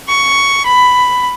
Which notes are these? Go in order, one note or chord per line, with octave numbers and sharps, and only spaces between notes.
C#6
B5